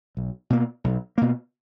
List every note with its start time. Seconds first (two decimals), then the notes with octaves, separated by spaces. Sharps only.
0.17 B1
0.50 B2 A#3
0.84 B1
1.18 B2 A#3